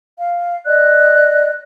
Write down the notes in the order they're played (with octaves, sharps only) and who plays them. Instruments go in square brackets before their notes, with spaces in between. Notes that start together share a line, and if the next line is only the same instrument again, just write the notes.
[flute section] F5
D5 D#5 F#6